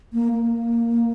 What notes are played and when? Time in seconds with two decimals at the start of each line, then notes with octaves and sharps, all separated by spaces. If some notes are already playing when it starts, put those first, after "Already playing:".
0.13 A#3
0.32 A#3